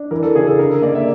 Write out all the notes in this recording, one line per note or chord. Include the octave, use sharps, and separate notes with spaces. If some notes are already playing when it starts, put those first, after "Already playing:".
Already playing: D4
E3 A#4
A4
C#3 G#4
A4
D3 A#4
A#3 D5
E5